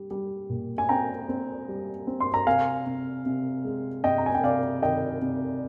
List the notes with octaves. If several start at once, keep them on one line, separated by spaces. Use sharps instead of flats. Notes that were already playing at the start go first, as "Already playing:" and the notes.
Already playing: G3
G3
A#2
G#5
C4 G5 A#5
C4
G3
C4
C6
A#5
C3 F5 G#5
C3
C3
G#3
C3 D#5 G5
A#5
G#5
G5
C3 D5 F5
D#3 D#5 G5
C3